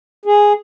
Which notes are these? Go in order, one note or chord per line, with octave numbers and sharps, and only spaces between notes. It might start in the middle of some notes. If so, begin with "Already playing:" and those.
G#4